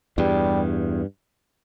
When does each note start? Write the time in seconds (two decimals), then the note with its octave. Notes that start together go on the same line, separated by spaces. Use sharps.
0.18 E2 G2 G3